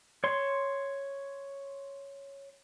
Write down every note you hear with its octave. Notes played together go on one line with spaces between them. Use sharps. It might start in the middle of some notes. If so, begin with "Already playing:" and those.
C#5 C6